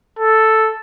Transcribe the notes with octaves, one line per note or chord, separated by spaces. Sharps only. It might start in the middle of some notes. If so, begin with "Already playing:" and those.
A4